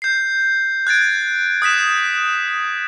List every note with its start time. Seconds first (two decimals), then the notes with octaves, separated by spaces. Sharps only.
0.02 G6 C7
0.87 F#6 G#6 A6 D7
1.62 D#6 F#6 B6 E7